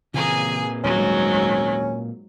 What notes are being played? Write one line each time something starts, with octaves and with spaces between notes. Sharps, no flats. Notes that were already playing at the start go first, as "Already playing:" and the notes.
A#2 C#3 E3 C4 G#4 G#5 A#5
D#1 G#2 F#3 G3 C#4